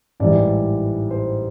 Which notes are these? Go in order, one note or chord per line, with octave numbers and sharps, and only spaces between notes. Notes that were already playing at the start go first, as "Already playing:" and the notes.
A1 G#2 E3 G3 D5
C5